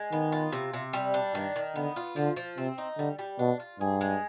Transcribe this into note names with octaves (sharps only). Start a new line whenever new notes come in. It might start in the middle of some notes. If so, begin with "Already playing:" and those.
Already playing: G#3
D#3 B3
F4
C3
C3
G3
D4
G2 D#3
D#3
D3 B3
F4
D3 F3
F3
C3 C4
D#4
D3 G3
G3
B2 D4
F4
G2 G#4
G#3